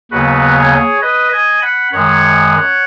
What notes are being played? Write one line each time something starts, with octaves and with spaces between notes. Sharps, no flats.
D#2 C#3 F#3 B3 F#4 B4
G#4 C#5
B4 D#5
D#5 G#5
F#5 B5
F#2 D#3 G#3 C#5 F#5